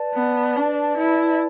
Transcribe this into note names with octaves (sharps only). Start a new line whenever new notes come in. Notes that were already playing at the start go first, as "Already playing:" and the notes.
Already playing: B4 D5 A5
B3
D4
E4